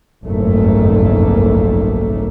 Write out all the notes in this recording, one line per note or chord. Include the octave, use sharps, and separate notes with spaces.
F#1 B1 F2 G#2 A3 A#3